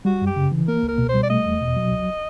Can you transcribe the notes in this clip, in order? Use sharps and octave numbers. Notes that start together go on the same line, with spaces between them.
G3 F#4
F#2 G4
C#3
E3
A#3 A#4
C#2
A#4
B2
C5
G3
D5
A3 D#5
E2
B2
F#3
C#2